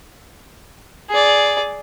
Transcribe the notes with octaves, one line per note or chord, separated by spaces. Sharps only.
G#4 D5